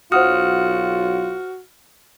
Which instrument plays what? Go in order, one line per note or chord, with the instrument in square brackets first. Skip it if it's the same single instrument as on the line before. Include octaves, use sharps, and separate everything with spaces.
[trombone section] B1 F#3 F4 [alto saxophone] F#4 [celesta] C5 F#5 D#6 [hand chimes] F6